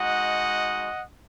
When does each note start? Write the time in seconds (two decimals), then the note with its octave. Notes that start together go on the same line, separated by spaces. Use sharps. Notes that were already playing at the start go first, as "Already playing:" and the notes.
Already playing: G#3 D#4 F#4 D#5 F#5